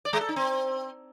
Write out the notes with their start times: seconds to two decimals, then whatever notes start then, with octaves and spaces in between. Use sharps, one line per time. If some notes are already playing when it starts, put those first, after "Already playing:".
0.05 D5
0.13 G#3
0.21 A4
0.29 D#4
0.36 C4